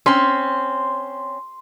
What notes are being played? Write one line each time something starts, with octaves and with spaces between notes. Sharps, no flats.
C4 C#4 C6